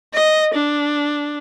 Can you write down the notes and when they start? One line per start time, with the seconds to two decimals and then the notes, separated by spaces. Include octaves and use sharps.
0.14 D#5
0.54 D4